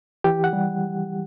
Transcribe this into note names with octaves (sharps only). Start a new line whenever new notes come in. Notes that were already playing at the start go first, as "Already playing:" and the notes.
E3 G4
F#5
G3